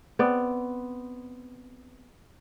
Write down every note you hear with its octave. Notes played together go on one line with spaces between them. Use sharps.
B3 C4 D5